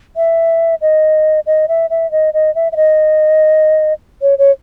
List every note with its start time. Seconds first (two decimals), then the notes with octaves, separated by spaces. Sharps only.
0.17 E5
0.81 D#5
1.46 D#5
1.68 E5
1.90 E5
2.11 D#5
2.34 D#5
2.55 E5
2.72 E5
2.76 D#5
4.22 C#5
4.38 C#5